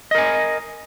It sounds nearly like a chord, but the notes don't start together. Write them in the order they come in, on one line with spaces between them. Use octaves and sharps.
D#5 A#4 G#5